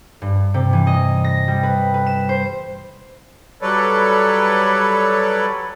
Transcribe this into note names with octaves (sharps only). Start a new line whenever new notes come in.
G2
C3
E3
D#5
A#6
G3
B4
B4
E7
C5
F#3 G3 A4 B4 C#5 D5